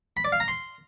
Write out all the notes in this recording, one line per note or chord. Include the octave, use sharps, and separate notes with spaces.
B5
D5
F5
A#5
C6